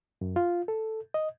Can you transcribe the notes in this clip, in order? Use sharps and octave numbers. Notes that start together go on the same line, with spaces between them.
F#2
F4
A4
D#5